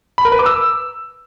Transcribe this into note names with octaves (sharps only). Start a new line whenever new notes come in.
B5
A#4
B4
D6
E6